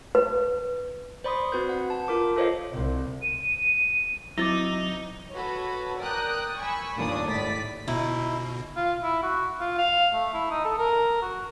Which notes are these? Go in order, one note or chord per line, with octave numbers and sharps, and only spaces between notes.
B4
C5 D5 B5 C6 D#6
C4 F#4 B4 G6
F#5
A5
F4 A#4 D6
F4 A4 C5 C#5 D#5 F5
C2
D#7
F#3 C4 D#4 E4 D6 A6 A#6
F#4 A4 B4 C#5
A#4 D5 G5 D#6 F#6
G#5 B5 C#6 E6
G1 D#2 A#2 D4 D5 D#6
G#1 A2 D5 A6 B6
G1 B2 D#4 E4
F4
E4
F#4
F4
F5
A3
E4
D#4
A4
A#4
F#4